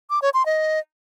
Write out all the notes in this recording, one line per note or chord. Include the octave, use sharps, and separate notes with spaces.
D6
C#5
C6
D#5